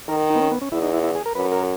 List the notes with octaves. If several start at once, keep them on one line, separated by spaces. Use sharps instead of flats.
D#3 A#4
D#4
B3
C#4
B3
C#4
E2 E4
D#4
E4
E4
G#4
A#4
F#2 B4
A#4